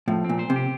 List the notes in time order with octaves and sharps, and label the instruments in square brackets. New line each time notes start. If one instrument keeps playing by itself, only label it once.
[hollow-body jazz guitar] A2 [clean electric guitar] F3
[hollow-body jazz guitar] A#2 [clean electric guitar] C4
[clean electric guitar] C5
[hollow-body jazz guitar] C3
[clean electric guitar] G4